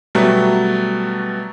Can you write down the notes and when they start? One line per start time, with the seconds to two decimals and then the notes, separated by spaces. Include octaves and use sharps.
0.15 B2 F#3 G3 A3